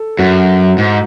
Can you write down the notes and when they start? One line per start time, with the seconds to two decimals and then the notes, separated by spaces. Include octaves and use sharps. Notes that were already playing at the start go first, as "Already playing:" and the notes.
Already playing: A4
0.19 F#2 F#4
0.78 G#2